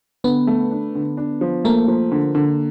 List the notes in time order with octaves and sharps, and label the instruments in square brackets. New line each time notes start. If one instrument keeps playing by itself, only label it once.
[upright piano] D3 [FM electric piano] B3
[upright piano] A3
D4
D3
D4
F3
[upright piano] A3 [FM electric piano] A#3
[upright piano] F3
D3
D3